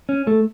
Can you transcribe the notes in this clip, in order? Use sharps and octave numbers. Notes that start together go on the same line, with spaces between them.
C#4
A3